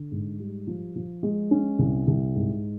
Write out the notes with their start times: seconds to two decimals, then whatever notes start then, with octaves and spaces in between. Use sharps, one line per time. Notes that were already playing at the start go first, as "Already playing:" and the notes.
Already playing: D3
0.12 G#2
0.39 G3
0.67 F3
0.96 F3
1.23 G#3
1.51 C#4
1.79 C2
2.07 C2
2.36 G#2